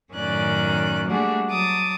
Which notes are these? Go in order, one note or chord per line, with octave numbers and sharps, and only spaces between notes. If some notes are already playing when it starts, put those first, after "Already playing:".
F#2 A2 D#3 C#4 D5 F#6
G3 A3 A#3 D4 F#4 G#4
F#3 A5 D6 D#6